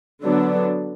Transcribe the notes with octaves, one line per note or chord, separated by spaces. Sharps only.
D3 F#3 B3 D4